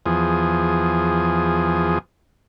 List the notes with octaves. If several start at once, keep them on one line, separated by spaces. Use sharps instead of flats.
E2 F3 G#4